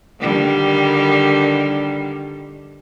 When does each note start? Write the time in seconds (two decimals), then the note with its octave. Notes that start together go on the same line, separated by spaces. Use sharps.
0.20 D3 D#3 G3